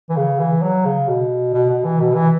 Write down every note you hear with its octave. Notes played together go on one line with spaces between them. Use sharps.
E3
C#3
E3
F#3
C#3
B2
B2
B2
E3
B2
E3